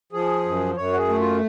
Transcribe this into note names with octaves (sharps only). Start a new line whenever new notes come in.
F3 G#4
F#2
F#2 C#5
F#4
G#4
A3
F4